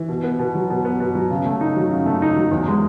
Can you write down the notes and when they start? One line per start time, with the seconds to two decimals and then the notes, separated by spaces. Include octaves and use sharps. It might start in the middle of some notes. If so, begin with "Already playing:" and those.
Already playing: E3
0.09 B2
0.23 B3
0.39 B2
0.55 F#3
0.70 B2
0.85 B3
1.00 B2
1.15 F#3
1.31 C#3
1.46 A3
1.61 D#4
1.76 F#3
1.90 C#3
2.06 A3
2.22 D#4
2.36 F#3
2.51 E2
2.68 G#3